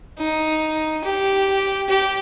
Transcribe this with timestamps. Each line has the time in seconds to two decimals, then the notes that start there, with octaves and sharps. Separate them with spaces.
0.18 D#4
1.03 G4
1.89 G4